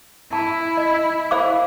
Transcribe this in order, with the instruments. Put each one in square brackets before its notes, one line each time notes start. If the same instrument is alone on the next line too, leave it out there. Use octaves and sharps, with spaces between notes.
[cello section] E4 [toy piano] A5
[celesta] D#5
[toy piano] C5 F5 D6